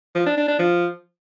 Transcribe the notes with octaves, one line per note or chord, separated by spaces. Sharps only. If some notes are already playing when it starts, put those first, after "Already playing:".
F3
D4
D4
D4
F3